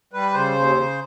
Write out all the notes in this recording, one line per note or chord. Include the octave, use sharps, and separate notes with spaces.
G3 B4
C#3 C5
D#2
C#3